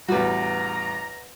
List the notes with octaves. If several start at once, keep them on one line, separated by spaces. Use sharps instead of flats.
A1 E2 G3 F#4 B4 A#5